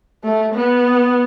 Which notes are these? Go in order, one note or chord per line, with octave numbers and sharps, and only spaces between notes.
A3
B3